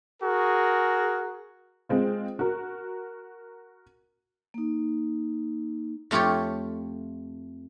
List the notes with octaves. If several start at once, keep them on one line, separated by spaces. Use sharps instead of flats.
F#4 G#4 A#4
G#3 C4 F4
F#4 A#4
A#3 D#4
F2 A3 F4 G4 C#5